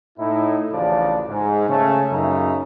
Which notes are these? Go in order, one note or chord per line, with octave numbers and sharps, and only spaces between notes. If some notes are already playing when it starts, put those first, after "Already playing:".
A2 D#4 E4
A1 D2 C#3 F3 D4 D5
G#2
C#3 A3 C#4
F#2 A#2 C#3 D#4 E5 A#5